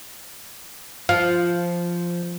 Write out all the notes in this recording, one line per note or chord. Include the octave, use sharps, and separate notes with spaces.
F3 F5